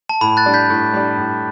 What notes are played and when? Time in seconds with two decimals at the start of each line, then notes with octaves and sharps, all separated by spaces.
0.09 A5
0.21 A2 B5
0.37 F#6 A6
0.46 G3 D4
0.54 G6 B6
0.70 A2
0.94 G3 D4
1.18 A2